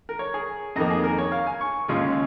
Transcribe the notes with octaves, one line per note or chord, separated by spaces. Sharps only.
A#4
C#5
G#4
F2 D#3 A#3 D#5
G#4
A#4
C#5
F5
G#5
C#6
D#2 C#3 G#3 C#4 F4